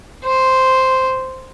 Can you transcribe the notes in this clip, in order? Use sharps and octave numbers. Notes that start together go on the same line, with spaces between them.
C5